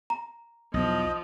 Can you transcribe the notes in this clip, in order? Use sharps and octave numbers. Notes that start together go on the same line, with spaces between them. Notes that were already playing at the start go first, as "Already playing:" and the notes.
A#5
B1 E2 F3 D#5